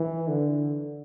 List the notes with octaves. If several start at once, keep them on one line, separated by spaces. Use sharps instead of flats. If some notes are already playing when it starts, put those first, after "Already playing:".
Already playing: E3
D3